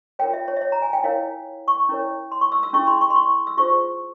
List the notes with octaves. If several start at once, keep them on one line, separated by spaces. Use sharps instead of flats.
F4 A#4 C#5 G5
E5
C#5
E5
C#5
A#5
G#5
G5
E4 A#4 C#5 F5
C#6
C#4 E4 A#4 C#5
C6
C#6
E6
E6
C#4 E4 G#4 C#6
C6
C#6
C6
C#6
E6
F4 G#4 C5 C#6